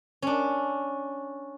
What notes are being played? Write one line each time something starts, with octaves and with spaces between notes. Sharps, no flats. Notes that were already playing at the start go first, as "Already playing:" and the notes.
C#4 D4